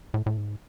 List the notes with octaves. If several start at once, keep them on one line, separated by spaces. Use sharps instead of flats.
A2
A2
G#2